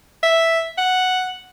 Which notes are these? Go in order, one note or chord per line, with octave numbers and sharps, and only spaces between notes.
E5
F#5